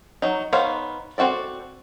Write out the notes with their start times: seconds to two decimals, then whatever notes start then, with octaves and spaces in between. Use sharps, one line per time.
0.22 F#3 D#4
0.53 B3 D#4 C5 C#5 F5
1.18 C4 F#4 A4 D5